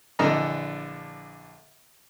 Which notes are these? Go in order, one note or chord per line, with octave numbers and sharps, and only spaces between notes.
A#1 D3 E3 D#5 A#5